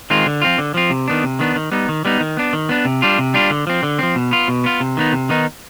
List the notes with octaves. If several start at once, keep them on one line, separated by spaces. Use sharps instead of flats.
D#3 G#3 C4 F4
D3
F3 C4 F4
D3
F3 C4 F4
C3
D#3 B3 D4
C3
D#3 B3 D4
D#3
G3 B3 D#4
D#3
G3 B3 D#4
D#3
B3 D4
D#3
B3 D4
C3
G3 D4 F4
C3
G3 D4 F4
D3
F3 C4
D3
F3 C4
B2
B3 F4
B2
B3 F4
C3
D#3 B3 D#4
C3
D#3 B3 D#4